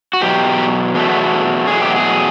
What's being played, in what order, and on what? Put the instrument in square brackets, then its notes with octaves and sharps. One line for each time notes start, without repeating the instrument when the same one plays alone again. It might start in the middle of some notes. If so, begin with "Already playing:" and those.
[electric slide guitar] F#4
E2 B2 F#3 G4
E2 B2 F#3 A3
E2 B2 F#3 A3 G#4
G4
G#4